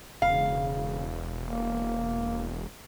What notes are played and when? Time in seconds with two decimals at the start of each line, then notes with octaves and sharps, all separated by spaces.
0.22 E1 C#3 F5
1.43 A#3